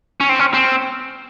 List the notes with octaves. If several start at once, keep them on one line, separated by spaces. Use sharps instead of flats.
C#4
C4
C#4
C4